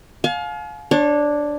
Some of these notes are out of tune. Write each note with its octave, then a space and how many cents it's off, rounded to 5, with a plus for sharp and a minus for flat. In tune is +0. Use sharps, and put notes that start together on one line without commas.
F5 +25 G#5 +45
D4 +0 C#5 -25